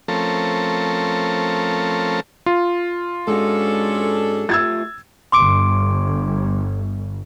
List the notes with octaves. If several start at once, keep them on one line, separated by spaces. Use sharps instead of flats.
F3 A3 C4 C#4 A4 A#4
F4
G#2 G#3 C#4 D4 F#4 A4
A3 F4 G4 E6 G#6 A6
G1 C6 D6 D7